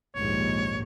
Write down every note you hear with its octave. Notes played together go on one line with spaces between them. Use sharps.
A#1 D#2 G#2 C#5